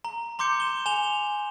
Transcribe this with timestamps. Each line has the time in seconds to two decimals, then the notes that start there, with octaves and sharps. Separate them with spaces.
0.05 A#5
0.39 A#5 C6 D6 G6 C#7
0.60 E7 G7
0.86 G#5 E7 F7 G7